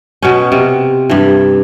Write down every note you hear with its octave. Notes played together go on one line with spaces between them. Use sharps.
B2 C#4
C3
G2 E3